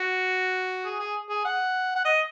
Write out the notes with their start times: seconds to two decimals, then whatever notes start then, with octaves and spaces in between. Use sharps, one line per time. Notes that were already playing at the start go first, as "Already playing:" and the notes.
Already playing: F#4
0.85 G#4
0.99 G#4
1.29 G#4
1.45 F#5
1.95 F#5
2.05 D#5